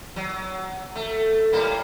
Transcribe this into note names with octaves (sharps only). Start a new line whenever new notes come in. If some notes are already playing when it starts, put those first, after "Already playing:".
F#3
A3
A2 G3 A#3